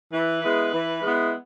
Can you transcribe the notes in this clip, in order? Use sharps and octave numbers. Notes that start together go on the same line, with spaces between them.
E3 B4
G#3 B3 E4
E3
G#3 B3 E4